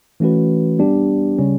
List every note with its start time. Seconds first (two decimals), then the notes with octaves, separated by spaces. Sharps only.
0.20 E3 A3 C#4 F#4 B4
0.79 G3 B3 D4 G4
1.38 C#3 G3 C#4